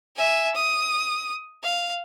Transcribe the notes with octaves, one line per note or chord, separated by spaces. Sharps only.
E5 G#5
D#6
F5